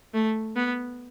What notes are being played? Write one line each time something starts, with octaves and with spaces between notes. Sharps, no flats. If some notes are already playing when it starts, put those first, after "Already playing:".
A3
B3